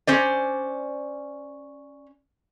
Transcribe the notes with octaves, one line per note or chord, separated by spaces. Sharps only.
C#4 C5 D5